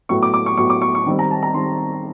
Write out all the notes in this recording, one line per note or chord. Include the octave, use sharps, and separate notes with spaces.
A2 F#3 B3 C#6
D6
D6
C#6
A2 F#3 B3 C#6
D6
C#6
C#6
D#3 G3 C4
A#5
A5
A#5
D#3 G3 C4 C6